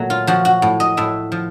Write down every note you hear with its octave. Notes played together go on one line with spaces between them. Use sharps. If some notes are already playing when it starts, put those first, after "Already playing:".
Already playing: A#2 F#3 A3
F4
F3 F#4
F#4
A2
D#5
A2 E5
F3